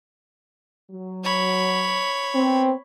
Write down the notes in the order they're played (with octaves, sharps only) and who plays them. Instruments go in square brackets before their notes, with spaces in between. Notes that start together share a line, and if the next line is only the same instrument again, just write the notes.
[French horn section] F#3
[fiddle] C#5 B5
[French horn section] B3 C4